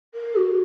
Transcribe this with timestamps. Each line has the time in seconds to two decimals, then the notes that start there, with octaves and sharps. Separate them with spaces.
0.14 A#4
0.35 F#4